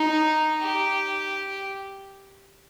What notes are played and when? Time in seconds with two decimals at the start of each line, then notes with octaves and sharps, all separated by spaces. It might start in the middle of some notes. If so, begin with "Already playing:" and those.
Already playing: D#4
0.61 G4